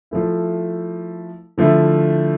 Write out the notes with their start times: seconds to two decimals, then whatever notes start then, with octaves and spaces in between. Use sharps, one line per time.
0.11 F3 A3 E4
1.58 D3 F3 A3 E4